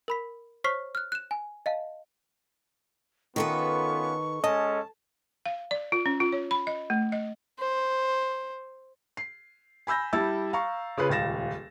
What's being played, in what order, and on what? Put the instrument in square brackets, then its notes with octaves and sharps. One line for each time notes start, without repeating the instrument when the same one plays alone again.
[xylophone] A#4 B5 B6
C5 C#5 C#6 F6 B6 C7
F6 F#6
F#6 E7
G#5
D#5 F5 A5
[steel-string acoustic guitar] D#3 A4 B4 [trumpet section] B3 C#4 F4 [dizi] C#6
[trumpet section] G#3 C#4 A4 [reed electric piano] D#5 [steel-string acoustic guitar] A5
[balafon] F5
D5
F4
C#4
F4
C#5
B5
D#5
A3
D#5
[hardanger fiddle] C5
[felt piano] C7
G#5 B5 E6 G6 A#6
G3 E4 A5 E6 A6
F5 A#5 C#6
C#3 F4 G#4 B4
D#1 C#2 A6 A#6 E7